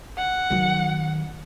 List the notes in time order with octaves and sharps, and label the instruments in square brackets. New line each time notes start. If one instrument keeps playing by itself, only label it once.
[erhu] F#5
[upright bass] D#3 F#3